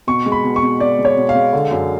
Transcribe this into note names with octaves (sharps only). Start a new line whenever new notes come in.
B2 C#6
G#3
B5
B2
C#6
B2
B2 D5
G#3
C#5
B2
F5
G#3
D3
F#2